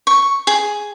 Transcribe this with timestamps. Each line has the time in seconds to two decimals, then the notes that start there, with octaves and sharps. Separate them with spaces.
0.07 C#6
0.47 G#4